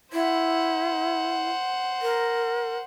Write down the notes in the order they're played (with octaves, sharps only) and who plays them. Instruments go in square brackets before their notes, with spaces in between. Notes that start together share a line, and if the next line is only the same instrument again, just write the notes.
[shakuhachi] E4 [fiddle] C5 F#5
[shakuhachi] A#4